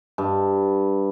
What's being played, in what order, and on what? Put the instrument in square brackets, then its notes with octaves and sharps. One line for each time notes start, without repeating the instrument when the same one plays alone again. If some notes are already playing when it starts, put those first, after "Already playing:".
[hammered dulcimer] G2